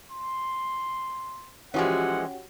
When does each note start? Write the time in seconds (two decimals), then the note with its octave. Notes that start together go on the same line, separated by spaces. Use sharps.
0.12 C6
1.74 E3 F3 G#3 C#4 F#4 G4 F#5